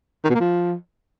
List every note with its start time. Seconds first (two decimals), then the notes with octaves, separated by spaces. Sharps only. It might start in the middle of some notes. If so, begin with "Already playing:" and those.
0.24 D#3
0.29 B2
0.35 A#3
0.40 F3